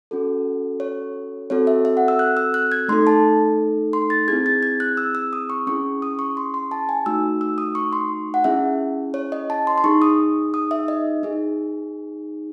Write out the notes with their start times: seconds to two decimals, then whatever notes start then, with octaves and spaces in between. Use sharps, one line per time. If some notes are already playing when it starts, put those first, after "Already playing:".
0.11 C#4 F#4 A4
0.80 C#5
1.50 C4 F#4 A4 C#5
1.67 E5
1.85 E5
1.97 F#5
2.08 E6
2.19 F#6
2.37 E6
2.54 F#6
2.72 G#6
2.88 A3 D#4 A4 C6
3.07 A5
3.93 C6
4.10 A6
4.28 C4 E4 G#4 G#6
4.46 A6
4.63 G#6
4.80 F#6
4.97 E6
5.15 E6
5.33 D#6
5.50 C#6
5.67 C#4 E4 G#4 C#6
6.02 D#6
6.19 C#6
6.37 C6
6.54 C6
6.71 A5
6.89 G#5
7.06 A3 D#4 F#4 E6
7.41 E6
7.58 D#6
7.75 C#6
7.93 C6
8.34 F#5
8.44 C#4 E4 G#4 E5
9.14 C#5
9.32 D#5
9.50 A5
9.67 C6
9.78 C6
9.84 D#4 G#4 C#6
10.02 D#6
10.54 D#6
10.71 E5
10.88 D#5
11.23 D#4 G#4